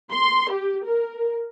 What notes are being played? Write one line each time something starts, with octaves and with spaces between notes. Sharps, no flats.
C6
G4
A#4